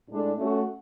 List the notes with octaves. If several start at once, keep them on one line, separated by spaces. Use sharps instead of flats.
A2 G#3 D4 A4
A3 C#4 F#4 A4